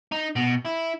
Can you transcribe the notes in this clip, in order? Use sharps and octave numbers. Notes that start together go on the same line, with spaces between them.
D#4
B2
E4